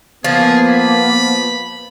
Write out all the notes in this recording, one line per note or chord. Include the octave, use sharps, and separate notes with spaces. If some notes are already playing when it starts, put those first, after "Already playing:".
F3 A#3 B3 G#4
B5